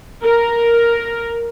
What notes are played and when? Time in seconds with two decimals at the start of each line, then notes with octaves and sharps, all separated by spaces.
0.24 A#4